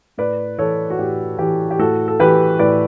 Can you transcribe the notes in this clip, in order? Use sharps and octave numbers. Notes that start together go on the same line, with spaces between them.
A2 B4 D5
E3 A4 C#5
F#4
A2 G4
E3 G4
G4
A2 F#4 A4
A4
E3 G4 B4
A2 B4 D5